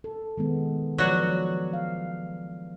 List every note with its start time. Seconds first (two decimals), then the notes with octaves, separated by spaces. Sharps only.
0.04 A4
0.37 D#3 G#3 B3
0.98 F3 F#3 F#4 B4 D5
1.73 F5